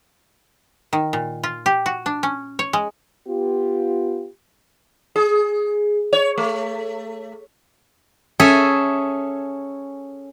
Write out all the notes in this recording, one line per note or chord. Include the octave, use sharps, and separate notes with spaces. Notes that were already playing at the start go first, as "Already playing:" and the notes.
D#3
A#2
F4
G4
F#4
D4
C#4
C#5
G#3
B3 F4 G4
G#4
C#5
A3
C#4 G#4 A4 E5